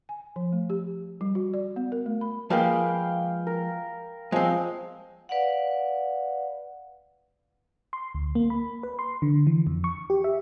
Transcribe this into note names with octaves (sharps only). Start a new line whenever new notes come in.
G#5
F3
A3
G4
G3
F#4
D5
B3
A#4
A3
B5
F3 G#3 A#3 B4 F5 G5
A#4
F3 G#3 C4
B4 D5 F5 F#5
C6
D2
A#3
B5
B4
C6
D3
E3
F2
C#6
G4
E5